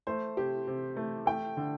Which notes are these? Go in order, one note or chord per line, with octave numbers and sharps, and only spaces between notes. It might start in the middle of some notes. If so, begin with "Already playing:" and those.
A3 C5
C3 G4
C3
A3
A3 G5
D3